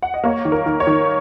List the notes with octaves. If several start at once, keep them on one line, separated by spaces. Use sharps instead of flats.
F#5
D#5
A#3 C#5
D#3
A#4
D#3
C#5
D#3